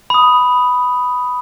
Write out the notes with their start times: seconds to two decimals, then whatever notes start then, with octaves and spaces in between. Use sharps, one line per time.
0.10 B5 D#6